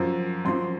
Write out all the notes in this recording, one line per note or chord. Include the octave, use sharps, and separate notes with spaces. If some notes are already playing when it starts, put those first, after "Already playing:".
Already playing: F#2 F3
F#2 F3 C6